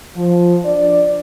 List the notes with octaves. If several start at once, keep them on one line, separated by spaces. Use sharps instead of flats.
F3
D4 D5